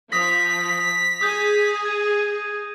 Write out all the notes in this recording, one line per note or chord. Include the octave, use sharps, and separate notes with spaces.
F3 D#6 A#6 B6
G#4 D#6 G6
G#6 D#7